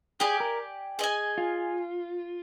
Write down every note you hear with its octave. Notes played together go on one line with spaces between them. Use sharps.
G4 G#4 D5 G#5
A#4
G#4 D#5 G#5
F4